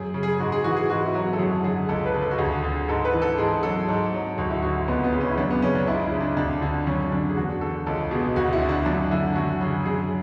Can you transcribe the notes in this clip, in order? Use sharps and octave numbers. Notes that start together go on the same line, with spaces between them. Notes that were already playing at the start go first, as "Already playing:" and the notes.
Already playing: F#2 G#4
C#3
G#4
G#2 F#4
G#4
E3 F#4
G#4
G#2 F#4
E4
F#3
F#4
A4
F#2 G#4
D3 G#4
C#2 A4
B4
C#3
A4
F#4
D2 G#4
D3
G#2 A4
B4
E3
A4
G#2 G#4
F#3 A4
G#2
F#3
D2 F#4
E4
D3 F#4
C#2 B3
B3
C#3
C#4
E4
F#2 D4
B3
C#3 C#4
D4
C#2 E4
E4
C#3
D4
D2 D4
D3
F#2 C#4
D3 D4
G#4
E2 F#4
D3 A4
C#2 A4
B2 G#4
D2 F#4
E4
D3
D4
F#2 D4
D3 E4
F#2 F#4
C#3 G#4
F#2 G#4